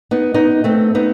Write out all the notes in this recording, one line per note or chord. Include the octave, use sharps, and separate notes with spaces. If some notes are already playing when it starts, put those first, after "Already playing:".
B3 D#4
B3 D#4
A3 C4
B3 D#4